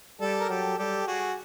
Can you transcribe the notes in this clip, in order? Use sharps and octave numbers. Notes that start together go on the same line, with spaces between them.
G3 G4 A4
A#4
F#3 G4 A4
G3 G4 A4
F#4 G#4